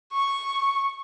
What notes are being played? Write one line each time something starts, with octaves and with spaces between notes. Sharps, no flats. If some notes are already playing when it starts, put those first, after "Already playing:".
C#6